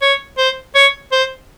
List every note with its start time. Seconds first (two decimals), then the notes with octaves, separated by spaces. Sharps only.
0.02 C#5
0.38 C5
0.75 C#5
1.12 C5